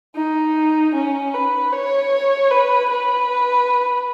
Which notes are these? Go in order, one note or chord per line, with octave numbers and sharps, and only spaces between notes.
D#4
C#4
B4
C#5
B4
B4